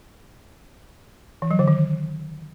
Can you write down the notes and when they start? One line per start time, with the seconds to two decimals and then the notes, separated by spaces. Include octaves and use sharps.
1.42 E3
1.51 F#3
1.59 D3
1.68 D#3